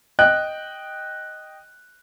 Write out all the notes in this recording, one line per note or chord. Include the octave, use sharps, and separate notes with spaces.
D#5 G5 F#6